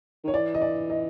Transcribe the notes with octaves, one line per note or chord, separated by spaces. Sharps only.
D#3 C#5
E3 D5
D#5
D5
D#5